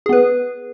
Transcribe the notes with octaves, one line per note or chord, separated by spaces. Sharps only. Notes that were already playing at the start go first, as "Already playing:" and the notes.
B3 G#4 B4